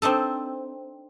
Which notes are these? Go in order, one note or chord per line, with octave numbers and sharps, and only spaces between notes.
C4 D4 D#4 A4